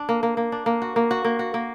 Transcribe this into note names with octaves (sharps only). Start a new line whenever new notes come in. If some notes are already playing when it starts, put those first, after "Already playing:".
Already playing: D4
A#3
A#3
A#3
D4
A#3
F#4
A#3
F#4
A#3
F#4
A#3